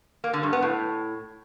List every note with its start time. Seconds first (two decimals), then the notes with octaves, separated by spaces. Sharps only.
0.24 A#3
0.33 D3
0.43 G2
0.53 B3
0.62 A2